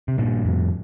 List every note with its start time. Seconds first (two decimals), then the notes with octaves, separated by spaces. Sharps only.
0.08 C3
0.18 G2 A#2
0.45 F2 A2